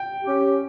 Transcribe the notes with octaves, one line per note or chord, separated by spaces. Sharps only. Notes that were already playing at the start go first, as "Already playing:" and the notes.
Already playing: G5
C#4 G4